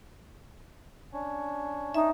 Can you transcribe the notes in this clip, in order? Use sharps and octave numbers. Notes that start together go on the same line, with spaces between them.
C#4 D4 C#5
D#4 E5